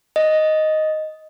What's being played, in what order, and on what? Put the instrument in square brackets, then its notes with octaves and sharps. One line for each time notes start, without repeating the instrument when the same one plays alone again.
[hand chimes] D#5